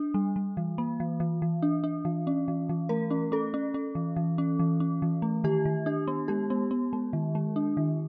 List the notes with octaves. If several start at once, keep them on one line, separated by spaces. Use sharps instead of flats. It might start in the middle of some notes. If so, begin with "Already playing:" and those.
Already playing: D4
G3
G3
E3
A#3
E3
E3
E3
D4
D4
E3
C#4
E3
E3
A3 A#4
C#4
C#4 A4
C#4
C#4
E3
E3
C#4
E3
C#4
E3
A3
D#3 G4
D#3
D4 G4
B3
G#3 G4
B3
B3
G#3
D#3
G#3
D4
D#3